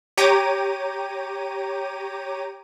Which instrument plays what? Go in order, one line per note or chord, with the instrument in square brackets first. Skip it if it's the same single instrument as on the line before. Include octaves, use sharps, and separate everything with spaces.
[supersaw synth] G4 C#5 G5 A#5 D6 D#7